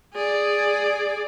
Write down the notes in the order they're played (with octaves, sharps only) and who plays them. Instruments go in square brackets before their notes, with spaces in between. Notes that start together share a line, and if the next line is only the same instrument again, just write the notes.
[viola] G#4 D5